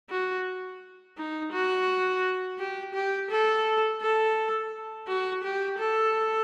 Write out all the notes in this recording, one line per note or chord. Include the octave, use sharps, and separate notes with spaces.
F#4
D#4
F#4
G4
G4
A4
A4
F#4
G4
A4